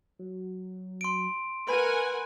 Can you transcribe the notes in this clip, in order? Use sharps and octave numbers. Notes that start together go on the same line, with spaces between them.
F#3
C6 D7
A#4 B4 F#5 G#5 B5